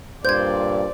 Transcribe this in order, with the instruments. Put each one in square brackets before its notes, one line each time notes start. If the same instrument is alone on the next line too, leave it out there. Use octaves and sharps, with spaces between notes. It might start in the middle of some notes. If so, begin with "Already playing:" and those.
[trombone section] G2 A#2 [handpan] C5 [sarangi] D5 [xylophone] G6 G#6